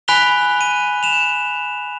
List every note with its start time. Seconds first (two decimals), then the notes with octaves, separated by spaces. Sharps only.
0.08 G#5 B5 F#6 B6 F7 G7
0.61 D#7
1.03 E7 F7